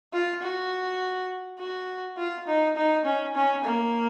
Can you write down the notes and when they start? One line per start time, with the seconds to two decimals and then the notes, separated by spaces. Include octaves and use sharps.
0.13 F4
0.42 F#4
1.59 F#4
2.18 F4
2.47 D#4
2.76 D#4
3.05 C#4
3.35 C#4
3.64 A#3